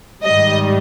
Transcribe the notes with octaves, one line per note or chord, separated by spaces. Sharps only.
G#2 D#3 G3 D#5